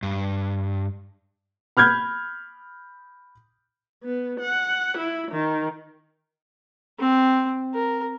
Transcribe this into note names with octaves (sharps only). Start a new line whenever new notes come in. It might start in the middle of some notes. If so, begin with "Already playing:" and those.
G2
B5 F6 G6 G#6
B3
F#5
E4
D#3
C4
A#4